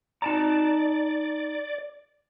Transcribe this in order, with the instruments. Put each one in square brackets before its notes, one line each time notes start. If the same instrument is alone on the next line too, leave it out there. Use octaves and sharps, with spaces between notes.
[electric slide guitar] D#4 A5 A#5 [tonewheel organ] D5